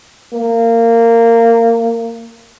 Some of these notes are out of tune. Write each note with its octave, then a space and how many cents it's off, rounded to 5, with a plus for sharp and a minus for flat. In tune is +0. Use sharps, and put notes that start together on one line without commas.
A#3 -20